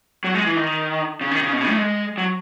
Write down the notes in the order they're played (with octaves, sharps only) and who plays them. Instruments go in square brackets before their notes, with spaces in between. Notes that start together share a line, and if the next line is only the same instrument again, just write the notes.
[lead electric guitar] F#3
G#3
E3
D#3
C#3
D#3
C#3
B2
C#3
A3
G#3
F#3